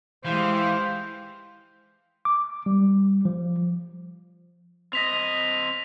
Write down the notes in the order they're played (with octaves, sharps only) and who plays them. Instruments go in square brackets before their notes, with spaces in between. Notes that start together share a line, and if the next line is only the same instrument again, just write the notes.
[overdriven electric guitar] E3 [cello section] G#3 G4 F5 [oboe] C5
[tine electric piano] D6
G3
F3
[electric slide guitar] C4 D#5 [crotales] A#6 B6 F7